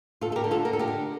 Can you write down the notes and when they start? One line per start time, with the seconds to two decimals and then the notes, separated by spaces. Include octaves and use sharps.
0.21 D2 F4 A4
0.32 A4
0.36 G4 A#4
0.44 D3
0.51 F4 A4
0.65 D3 A#4
0.73 A4
0.79 G4 A#4
0.88 D3